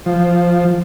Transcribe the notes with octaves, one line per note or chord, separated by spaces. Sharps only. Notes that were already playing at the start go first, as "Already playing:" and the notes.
F3